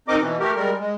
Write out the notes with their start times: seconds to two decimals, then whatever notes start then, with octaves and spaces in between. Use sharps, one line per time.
0.08 C4 D#4 A#4 D#5 D6
0.19 B2 E3
0.40 A3 G4 A#4
0.56 G3 G#3 A#4
0.79 G#3